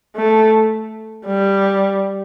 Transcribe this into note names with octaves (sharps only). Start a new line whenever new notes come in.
A3
G3